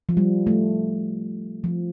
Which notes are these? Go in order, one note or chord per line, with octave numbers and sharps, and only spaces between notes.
F3
G3
A3
F3